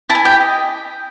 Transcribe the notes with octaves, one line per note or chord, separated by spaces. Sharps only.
E4 A5
G#5
G4 G5
D#5